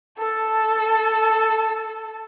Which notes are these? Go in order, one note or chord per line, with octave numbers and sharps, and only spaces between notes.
A4 A5